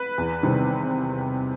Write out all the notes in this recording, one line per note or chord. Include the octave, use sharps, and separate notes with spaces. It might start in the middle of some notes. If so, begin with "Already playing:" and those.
Already playing: B4
E2
C3 D#3 G3 C4